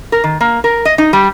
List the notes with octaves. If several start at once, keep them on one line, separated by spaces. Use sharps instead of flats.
A#4
D#3
A#3
A#4
D#5
D#4
G3